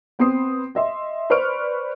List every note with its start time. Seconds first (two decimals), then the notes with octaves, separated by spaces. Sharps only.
0.19 B3 C4 C6 D#6 C7
0.75 D#5 E5 C6
1.30 B4 C5 D5 C#6 F6 D7